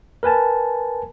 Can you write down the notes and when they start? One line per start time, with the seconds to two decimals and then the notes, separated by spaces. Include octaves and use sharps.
0.23 A#4 B4 G#5 A5